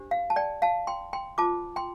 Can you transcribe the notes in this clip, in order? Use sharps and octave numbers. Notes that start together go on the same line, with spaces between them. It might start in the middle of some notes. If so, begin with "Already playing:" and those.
Already playing: D4 G4 C5
F5
A5
D5 G5
F5 A5
G5 C6
G5 C6
F4 C5 A5 D6
G5 C6